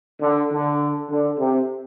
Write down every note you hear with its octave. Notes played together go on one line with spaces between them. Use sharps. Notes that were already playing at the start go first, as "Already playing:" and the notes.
D3
D3
D3
C3